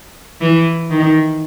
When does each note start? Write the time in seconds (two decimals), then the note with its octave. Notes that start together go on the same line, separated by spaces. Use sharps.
0.41 E3
0.91 D#3